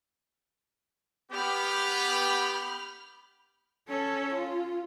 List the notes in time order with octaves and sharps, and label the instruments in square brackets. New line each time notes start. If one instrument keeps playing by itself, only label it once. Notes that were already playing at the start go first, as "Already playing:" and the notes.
[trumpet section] B3 G4 [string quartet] B5 F6 G6
[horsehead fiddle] C#4 A4
F4